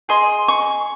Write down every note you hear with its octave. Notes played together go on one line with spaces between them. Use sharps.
G#4 D#5 C6
C#6